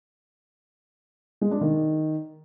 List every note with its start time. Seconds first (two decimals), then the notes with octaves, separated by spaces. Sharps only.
1.41 G#3
1.51 D4
1.61 D#3